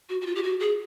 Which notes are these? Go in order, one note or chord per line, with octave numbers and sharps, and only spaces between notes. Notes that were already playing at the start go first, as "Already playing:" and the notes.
F#4
F#4
F4
G4
F#4
G#4